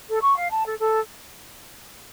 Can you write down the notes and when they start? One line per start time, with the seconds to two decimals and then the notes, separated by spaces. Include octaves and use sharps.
0.09 A4
0.22 C#6
0.37 F5
0.50 A5
0.65 A4
0.79 A4